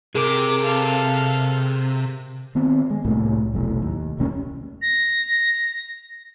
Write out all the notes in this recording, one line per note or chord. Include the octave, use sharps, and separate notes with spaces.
C3 G#4 A#4 D6
A4 F5
D#3 B3 C4
G#3
C2 A2 A3 A#3
F1 B1 A2
D#2
E1 C2 A#3 C#4
A#6